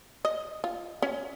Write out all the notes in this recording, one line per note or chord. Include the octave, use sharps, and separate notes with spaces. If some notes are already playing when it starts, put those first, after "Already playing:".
D#5
F4
C#4